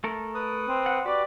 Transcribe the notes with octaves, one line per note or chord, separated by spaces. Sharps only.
A3 A4 A#4
B4 D#6
C4
F#5
F#4 G4 B4 D5